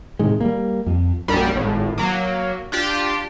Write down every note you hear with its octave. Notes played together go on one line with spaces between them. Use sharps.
A2 C3 D#3 G#3
G3 A#3
F2
A#1 F#2 G3
G#1 A2
F#3 A#3
D4 F4 G4